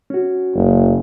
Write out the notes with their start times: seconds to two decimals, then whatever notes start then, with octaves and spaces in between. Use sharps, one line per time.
0.10 C#4 F#4
0.55 F#1